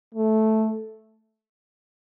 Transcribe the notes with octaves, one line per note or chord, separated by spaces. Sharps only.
A3